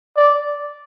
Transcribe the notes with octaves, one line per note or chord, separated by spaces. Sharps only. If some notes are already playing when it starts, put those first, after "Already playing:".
D5